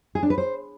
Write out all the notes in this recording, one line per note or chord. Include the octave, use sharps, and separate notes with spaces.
G#4
D4
B4
C5